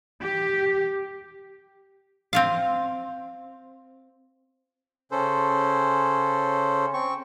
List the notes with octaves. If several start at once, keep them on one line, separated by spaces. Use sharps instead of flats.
G4
C4 F4 F5
C#3 C#4 A4 C5
C4 C#6